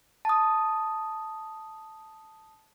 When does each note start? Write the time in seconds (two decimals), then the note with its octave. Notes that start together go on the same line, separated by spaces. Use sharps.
0.25 A5 D#6